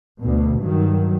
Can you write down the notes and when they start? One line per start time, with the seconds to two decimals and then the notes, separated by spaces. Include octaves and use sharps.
0.22 D2 B2
0.61 G2 D#3 F#3